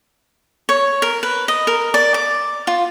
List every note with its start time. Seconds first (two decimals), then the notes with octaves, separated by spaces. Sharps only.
0.69 C#5
1.02 A#4
1.23 B4
1.48 D#5
1.67 A#4
1.94 D5
2.14 D6
2.67 F4